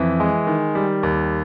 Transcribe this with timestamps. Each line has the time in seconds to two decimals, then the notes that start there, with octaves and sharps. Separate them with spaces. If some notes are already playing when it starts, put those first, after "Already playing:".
Already playing: F2 E3
0.20 G#3
0.47 D#3
0.75 G3
1.03 D#2